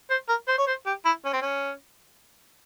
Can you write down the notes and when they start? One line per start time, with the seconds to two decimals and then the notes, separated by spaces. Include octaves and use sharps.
0.10 C5
0.29 A#4
0.48 C5
0.58 C#5
0.67 C5
0.86 G4
1.05 E4
1.25 C#4
1.33 C4
1.42 C#4